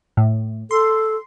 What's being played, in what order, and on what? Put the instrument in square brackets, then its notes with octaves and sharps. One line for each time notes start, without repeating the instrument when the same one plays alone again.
[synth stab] A2
[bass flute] A4 [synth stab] C6